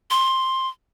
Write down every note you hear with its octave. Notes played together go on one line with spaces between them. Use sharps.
C6